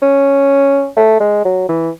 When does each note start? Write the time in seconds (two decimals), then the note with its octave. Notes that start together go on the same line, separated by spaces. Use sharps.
0.02 C#4
0.97 A3
1.20 G#3
1.45 F#3
1.69 E3